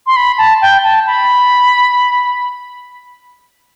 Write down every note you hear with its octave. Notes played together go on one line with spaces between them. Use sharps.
C6
B5
A5
G5
A5
B5